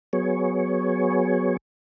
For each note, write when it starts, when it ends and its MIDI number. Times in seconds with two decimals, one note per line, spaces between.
0.13 1.57 54
0.13 1.57 59
0.13 1.57 68
0.13 1.57 73